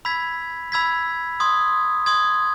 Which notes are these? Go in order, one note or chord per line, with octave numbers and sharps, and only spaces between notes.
B5 E6 G#6 B6
B5 E6 G#6 B6
C6 D#6 G#6
C6 D#6 G#6